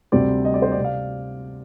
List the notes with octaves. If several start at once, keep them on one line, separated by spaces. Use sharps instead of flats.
D2 C3 G3 C4 D5
D#5
D5
C5
D5
C3
F5